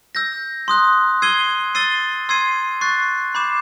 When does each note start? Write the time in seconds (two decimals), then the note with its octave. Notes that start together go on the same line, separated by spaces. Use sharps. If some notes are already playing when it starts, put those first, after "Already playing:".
0.15 E6 G6 A#6
0.68 C6 D#6 F#6
1.22 E6 G#6 C7 D#7 G7
1.75 E6 A6 C7 D#7 G7
2.29 C6 E6 G#6 C7 D#7
2.81 C#6 F#6 A6 C7
3.35 B5 D6 G6 C7 E7